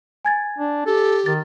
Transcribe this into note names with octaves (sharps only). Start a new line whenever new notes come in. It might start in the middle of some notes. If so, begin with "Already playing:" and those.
G#5 G#6 A6
D4
G4 A4
D#3 A6